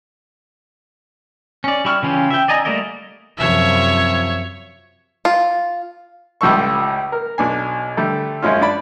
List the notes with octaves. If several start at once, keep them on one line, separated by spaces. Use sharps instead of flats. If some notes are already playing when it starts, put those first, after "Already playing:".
C#4 D5
G3 E4 C#6 F6
C#3 E3 C#4 F4 G4
E5 G5
D5 D#5 G#5 A#5
G3 A3 A#3 D5 D#5
F#2 C3 F3 C#5 E5
F4
C#2 A2 G3 F4 A4 C#6
A#4
B1 D4 G#5
D3 G3 A3
F#2 G#3 C#4 F4
D4 D5 B5